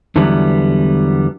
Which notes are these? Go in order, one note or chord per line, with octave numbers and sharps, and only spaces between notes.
E2 D3 E3 F#3 G3 B3